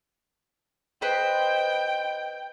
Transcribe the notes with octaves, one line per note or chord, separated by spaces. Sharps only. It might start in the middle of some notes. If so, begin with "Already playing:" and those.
B4 C5 D#5 G5